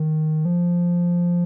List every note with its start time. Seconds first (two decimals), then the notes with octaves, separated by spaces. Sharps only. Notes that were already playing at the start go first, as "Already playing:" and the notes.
Already playing: D#3
0.45 F3